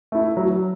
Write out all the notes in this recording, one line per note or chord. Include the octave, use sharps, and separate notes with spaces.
A3 E4
F#3